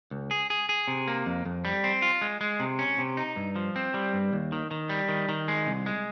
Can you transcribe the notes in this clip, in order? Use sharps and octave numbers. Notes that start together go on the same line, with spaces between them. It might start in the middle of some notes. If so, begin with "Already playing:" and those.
C#2
G#4
G#4
G#4
C3
A#3
F2
F2
G3
C4
F4
G#3
G#3
C3
C#4
C3
D#4
G2
F3
C4
G3
G2
D#2
D#3
D#3
G3
D#3
D#3
G#3
C2
G#3